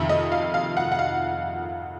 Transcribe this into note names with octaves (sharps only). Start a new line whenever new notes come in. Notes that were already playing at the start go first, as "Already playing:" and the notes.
Already playing: F2 C3 D#3 E5
D#5
F5
F5
F#5
F#5
F5